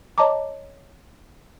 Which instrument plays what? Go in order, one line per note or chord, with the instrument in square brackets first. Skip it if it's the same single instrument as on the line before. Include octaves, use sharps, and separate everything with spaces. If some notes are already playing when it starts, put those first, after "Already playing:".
[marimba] C#5 D#5 A5 A#5 D6